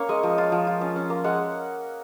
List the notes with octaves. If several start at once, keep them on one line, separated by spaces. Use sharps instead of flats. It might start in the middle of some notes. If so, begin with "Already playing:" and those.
Already playing: A#3 C#4 C#5
G#3 D#5
F3
F4
F3
F4
C#4
C#4
A#3
G#3 F#5